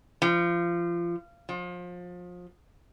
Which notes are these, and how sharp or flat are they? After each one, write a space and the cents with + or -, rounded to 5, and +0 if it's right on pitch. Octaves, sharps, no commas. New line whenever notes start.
F3 -25
F3 +30